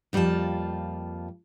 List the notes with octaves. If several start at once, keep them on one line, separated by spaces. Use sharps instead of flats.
F2 G3 A#3 F4 A5